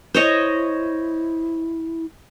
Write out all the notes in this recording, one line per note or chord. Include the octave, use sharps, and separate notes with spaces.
E4 C5 C#5 D#5